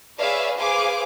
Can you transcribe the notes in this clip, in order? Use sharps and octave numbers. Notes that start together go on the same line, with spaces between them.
G#4 B4 C#5 D5 E5 F5
G#4 B4 C5 F5 G#5 D6